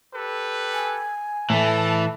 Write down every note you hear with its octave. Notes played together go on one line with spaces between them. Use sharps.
G4 A4 B4
G#5
A2 E3 A3 E5 A5